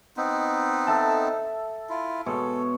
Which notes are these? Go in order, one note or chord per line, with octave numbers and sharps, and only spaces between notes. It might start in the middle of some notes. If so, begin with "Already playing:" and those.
B3 C4 D#4
A4 E5 A5
E4 F4
B2 G#3 A4 C#5